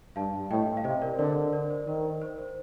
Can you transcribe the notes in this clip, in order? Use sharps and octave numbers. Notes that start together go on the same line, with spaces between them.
G2 F5 A5
A2 D#5 G5
F5
C3 C5 D#5
A#4 D5
D3 A#4 D5
A#4 D5
C5
D#3 A#4
C5
C5